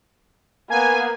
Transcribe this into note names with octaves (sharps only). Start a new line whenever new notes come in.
A#3 B3 G#5